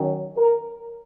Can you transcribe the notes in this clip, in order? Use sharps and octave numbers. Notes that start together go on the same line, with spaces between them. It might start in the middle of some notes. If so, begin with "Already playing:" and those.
Already playing: D#3 F#3 C#4
A#4